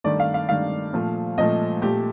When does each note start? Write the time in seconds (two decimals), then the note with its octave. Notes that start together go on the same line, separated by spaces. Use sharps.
0.04 G2 D#3 A3 D5
0.20 F5
0.34 F5
0.49 G2 D#3 A3 F5
0.93 A#2 F3 A3
1.38 A#2 F3 A3 D#5
1.82 A#2 A3 G4